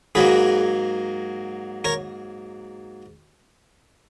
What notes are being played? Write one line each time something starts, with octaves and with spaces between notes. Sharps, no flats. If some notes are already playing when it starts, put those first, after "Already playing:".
G#2 F#3 A#3 G#4 B4
A#4 C#5